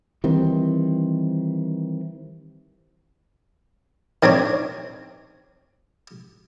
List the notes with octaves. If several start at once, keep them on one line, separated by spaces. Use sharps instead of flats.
D#3 E3 G3 C4
D#3 C4 D4 C#5